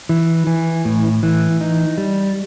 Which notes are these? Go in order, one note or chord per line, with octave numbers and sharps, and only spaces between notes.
E3
E3
A2
E3
D#4
G3